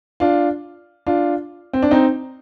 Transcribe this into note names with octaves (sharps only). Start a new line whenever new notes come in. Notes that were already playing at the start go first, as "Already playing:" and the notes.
D4 F4
D4 F4
C4
D4
C4 D#4